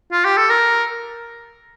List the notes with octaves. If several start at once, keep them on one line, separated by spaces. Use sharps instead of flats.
F4
G4
A4
A#4